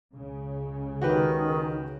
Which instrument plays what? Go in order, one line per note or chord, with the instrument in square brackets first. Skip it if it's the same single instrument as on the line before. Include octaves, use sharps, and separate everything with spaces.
[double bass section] C#2 C#3
[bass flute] D#3 [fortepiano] F#4 G4 B4